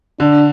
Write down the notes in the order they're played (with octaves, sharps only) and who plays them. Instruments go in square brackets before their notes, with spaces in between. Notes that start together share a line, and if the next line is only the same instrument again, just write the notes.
[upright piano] D3 [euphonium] D4